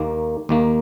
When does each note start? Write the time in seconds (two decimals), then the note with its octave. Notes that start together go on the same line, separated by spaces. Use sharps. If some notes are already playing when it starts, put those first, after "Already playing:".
Already playing: D#2 D#3 A#3
0.49 D#2 D#3 A#3